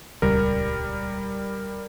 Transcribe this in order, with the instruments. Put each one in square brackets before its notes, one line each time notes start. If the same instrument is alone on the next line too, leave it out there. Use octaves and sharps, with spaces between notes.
[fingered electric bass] D#1 C#2 [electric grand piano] G3 A#4